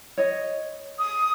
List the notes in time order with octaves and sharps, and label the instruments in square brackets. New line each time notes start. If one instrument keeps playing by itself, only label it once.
[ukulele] C#5 D#5
[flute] D#6